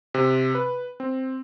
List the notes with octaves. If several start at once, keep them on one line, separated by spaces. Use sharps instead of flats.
C3
B4
C4